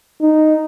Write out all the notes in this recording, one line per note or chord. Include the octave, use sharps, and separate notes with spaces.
D#4